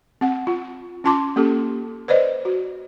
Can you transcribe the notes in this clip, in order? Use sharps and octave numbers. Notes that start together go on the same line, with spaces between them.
C4 F#5
F4
C#4 F4 A5 C6 D6
A#3 C#4 G4 A4
B4 C5 D5 D#5
F#4